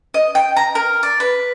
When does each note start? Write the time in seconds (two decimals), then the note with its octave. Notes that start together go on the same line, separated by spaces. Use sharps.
0.14 D#5
0.35 G5
0.56 A#5
0.75 A#4
1.03 D5
1.20 B4